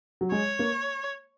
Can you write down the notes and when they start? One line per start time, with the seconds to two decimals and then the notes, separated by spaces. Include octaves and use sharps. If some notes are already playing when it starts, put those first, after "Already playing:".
0.21 F#3
0.32 G#3 C#5
0.59 A#3